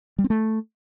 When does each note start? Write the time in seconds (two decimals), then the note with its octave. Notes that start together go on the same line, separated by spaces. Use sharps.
0.18 G3
0.24 C4
0.30 A3